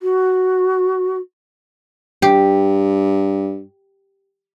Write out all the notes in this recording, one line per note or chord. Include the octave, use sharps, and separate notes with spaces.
F#4
G2 G4